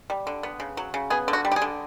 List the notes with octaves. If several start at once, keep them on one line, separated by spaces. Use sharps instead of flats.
G3
D3
B3
C#3
F#3
C#3
B3 G#4
D3
F#4
G3
G4
G#4
D3